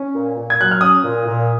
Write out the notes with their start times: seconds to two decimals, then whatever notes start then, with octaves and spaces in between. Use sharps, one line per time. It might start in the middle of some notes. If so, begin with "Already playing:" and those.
Already playing: C#4
0.13 A#2
0.36 A#2
0.50 G#6
0.58 F#3 F#6
0.71 F6
0.81 C#4 D#6
1.04 A#2
1.26 A#2